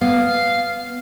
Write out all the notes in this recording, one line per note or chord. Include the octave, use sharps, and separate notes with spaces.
B3 F5